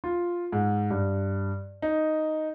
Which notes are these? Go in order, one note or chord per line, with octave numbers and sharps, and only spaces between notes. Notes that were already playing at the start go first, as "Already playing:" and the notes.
F4
G#2
G2
D#4